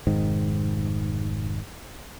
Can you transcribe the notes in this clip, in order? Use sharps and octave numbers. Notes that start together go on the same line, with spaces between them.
F1 G#2 D#3